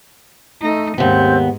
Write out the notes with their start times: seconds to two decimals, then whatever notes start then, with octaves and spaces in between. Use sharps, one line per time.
0.62 A3 D#4
0.98 D#2 G#2 B3 C4